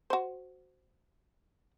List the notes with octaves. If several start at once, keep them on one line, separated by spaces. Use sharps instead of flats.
F#4 C5